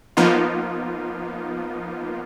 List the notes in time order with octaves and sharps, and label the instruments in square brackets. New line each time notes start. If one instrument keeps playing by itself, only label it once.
[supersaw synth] F3 A#3 B3 D#4 F4